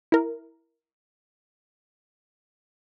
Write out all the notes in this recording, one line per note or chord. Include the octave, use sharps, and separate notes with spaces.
E4 A#4